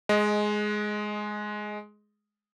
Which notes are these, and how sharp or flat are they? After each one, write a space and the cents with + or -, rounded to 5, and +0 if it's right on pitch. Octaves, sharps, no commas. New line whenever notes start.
G#3 +10 D#5 +0